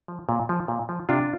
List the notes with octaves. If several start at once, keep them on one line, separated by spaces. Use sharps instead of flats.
F3
A#2
F3
A#2
F3
C3 D4 F4